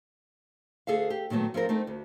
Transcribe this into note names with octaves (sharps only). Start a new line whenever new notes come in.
D2 G#4 A4 E5 F5
G4
A#2 D#3 F#3 A3 B3
F3 C4 F4 A#4
A3 C4 D#4
D2